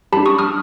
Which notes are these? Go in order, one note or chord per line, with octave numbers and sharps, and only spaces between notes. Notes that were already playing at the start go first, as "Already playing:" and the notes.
D4 G4 A5 B5
C#6 D#6
D#6 F6